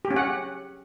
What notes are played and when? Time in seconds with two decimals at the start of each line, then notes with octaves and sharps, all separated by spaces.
0.05 G4
0.10 C#4
0.16 F#5